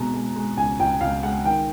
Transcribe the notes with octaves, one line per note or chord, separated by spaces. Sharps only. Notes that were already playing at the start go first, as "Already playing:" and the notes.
Already playing: B2 G#3 A#5
G#3
G#3
C#2 G#5
C#2 G5
C#2 F5
G#3 F#5
D#3 G5